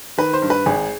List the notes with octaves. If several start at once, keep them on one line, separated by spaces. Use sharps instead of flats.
D#3 B4
C5
G2
B4
G#1 G#4